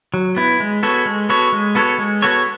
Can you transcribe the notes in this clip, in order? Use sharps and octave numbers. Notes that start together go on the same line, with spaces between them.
F#3
B3 E4
G#3
B3 F#4 A4 C#5
G#3
B3 F#4 A4 C#5
G#3
B3 F#4 A4 C#5
G#3
B3 F#4 A4 C#5